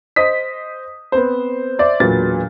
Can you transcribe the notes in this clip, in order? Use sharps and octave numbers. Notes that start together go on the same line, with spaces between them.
C5 D#5 D#6 B6
B3 C4 C5
C5 D5 E5
E1 A#2 F#3 B4 A6